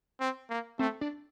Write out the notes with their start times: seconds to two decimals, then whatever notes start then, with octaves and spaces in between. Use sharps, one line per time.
0.20 C4
0.50 A#3
0.79 A3 C4
1.01 D4